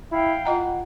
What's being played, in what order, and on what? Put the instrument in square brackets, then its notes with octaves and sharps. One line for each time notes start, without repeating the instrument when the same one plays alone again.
[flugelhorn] E4 [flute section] F5 G5
[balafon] F4 D#5 A#5 [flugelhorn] F#5